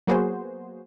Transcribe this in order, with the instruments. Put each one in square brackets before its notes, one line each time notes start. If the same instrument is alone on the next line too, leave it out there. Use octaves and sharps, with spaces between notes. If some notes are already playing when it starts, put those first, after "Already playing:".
[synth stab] F#3 A#3 B3 F#4 G#4 C5